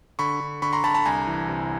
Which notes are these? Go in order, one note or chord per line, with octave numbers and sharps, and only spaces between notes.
D3 B5 C#6
D3
D3 B5 C#6
A#5 C6
D3 A5 B5
A5 B5
C2 G#5 A#5
E3
C3